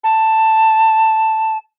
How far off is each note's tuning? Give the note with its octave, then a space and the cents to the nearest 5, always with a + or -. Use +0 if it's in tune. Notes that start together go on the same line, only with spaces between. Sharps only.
A5 +5